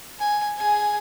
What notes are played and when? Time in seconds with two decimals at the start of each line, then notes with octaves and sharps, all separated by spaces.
0.19 G#5
0.57 G#4 G#5